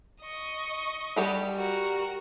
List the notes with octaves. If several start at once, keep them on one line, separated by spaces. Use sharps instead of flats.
D#5 C#6
G3 G4 F#5
F#4 A#4